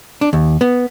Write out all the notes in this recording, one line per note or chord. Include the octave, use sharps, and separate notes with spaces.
D4
D#2
B3